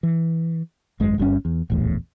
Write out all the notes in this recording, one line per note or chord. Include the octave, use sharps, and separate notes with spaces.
E3
G#1 F#2 G#3
G1 G2 D#3 C#4
E2
D1 A#1 E2 A2